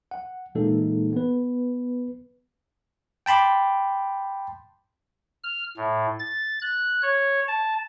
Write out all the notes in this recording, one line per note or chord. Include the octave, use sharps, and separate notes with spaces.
F#5
A#2 E3 G#3 A#3 D#4 A4
B3 B4
G5 A5 B5 C6 D6
F6
A2
A6
F#6
C#5
A5